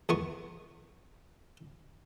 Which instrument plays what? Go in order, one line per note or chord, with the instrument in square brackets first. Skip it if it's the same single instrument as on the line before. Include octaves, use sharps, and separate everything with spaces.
[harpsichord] E2 B3 C#6